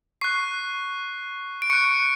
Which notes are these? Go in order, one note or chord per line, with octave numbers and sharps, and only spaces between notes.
C#6 F#6 C7
D7
C#6 F#6 C#7